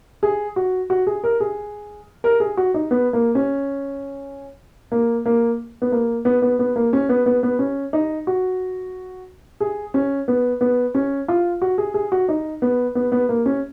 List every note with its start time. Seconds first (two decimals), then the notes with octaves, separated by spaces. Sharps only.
0.23 G#4
0.56 F#4
0.90 F#4
1.07 G#4
1.24 A#4
1.40 G#4
2.24 A#4
2.40 G#4
2.57 F#4
2.74 D#4
2.91 B3
3.13 A#3
3.35 C#4
4.92 A#3
5.26 A#3
5.82 B3
5.92 A#3
6.25 B3
6.42 B3
6.59 B3
6.76 A#3
6.93 C#4
7.09 B3
7.26 B3
7.43 B3
7.59 C#4
7.93 D#4
8.27 F#4
9.60 G#4
9.94 C#4
10.28 B3
10.61 B3
10.95 C#4
11.28 F4
11.62 F#4
11.78 G#4
11.94 G#4
12.12 F#4
12.29 D#4
12.62 B3
12.95 B3
13.12 B3
13.29 A#3
13.46 C#4